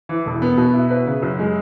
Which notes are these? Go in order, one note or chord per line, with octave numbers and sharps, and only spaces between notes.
E3
E1
B3
B2
E4
B4
C#3
F#2
G#3